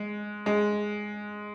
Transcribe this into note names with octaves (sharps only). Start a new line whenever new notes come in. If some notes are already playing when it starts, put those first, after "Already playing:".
Already playing: G#3
G#3